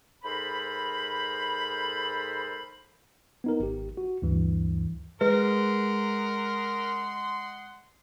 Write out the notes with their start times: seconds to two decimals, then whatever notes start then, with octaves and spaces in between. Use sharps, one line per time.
0.23 G#2 A4 A#4 C5 B5
3.44 B3 D#4 A#4
3.60 G#1 G4
3.97 F#4
4.22 D2 G2 E3
5.21 G#3 A#4 B4 D#5 F#5 C6